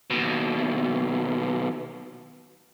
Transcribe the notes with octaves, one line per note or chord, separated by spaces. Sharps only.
D#2 B2